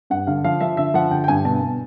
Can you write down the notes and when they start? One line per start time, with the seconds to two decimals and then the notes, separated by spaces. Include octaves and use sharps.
0.10 G2 F#5
0.27 D3 F5
0.44 F3 F5
0.60 F3 E5
0.77 D3 E5
0.94 F3 F#5
1.11 D3 G5
1.24 G5
1.28 G2 G#5
1.44 B2 A5
1.62 B2